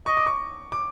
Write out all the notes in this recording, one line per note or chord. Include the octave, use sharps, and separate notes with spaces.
D#5 C#6
D6
C#6
D6